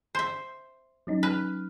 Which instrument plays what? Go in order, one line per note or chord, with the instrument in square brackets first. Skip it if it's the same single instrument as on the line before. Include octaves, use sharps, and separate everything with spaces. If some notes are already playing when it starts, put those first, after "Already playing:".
[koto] C5 E5
[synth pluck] F#3 C#4 D#4
[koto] B4 [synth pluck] F6